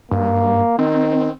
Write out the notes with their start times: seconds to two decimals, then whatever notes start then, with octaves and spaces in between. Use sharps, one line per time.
0.11 G2 A#3
0.79 D#3 C4